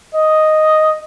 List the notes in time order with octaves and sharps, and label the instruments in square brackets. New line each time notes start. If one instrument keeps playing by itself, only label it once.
[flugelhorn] D#5